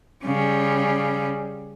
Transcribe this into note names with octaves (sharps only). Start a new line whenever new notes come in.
C#3 G3